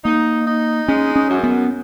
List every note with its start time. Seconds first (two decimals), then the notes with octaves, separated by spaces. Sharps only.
0.05 A#3 D#4
0.47 D#4
0.87 G#3 C#4
1.16 C#4
1.29 F#2
1.43 B3